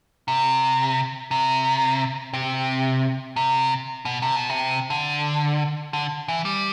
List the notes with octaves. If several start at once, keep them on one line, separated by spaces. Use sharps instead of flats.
C3
C3
C3
C3
B2
C3
B2
C3
D3
D3
E3
G3